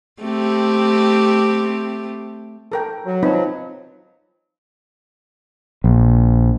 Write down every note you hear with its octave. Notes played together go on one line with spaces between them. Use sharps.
A3 C4 G4
A4 A#4 G5
F#3
F3 F#3 C4 D#4 B4
A#1